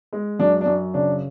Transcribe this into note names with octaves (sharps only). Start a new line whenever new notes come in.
G#3
F#2 D4
D4
F#2
C#3 D4